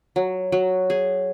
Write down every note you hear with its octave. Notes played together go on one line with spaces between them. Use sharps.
F#3
F#3
G#4